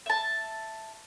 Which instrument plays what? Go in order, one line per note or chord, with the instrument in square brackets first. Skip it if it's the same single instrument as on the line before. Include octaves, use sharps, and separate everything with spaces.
[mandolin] E5 A5